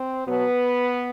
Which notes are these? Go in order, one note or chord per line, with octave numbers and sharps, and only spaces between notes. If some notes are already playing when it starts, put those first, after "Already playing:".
Already playing: C4
B2 F#3 B3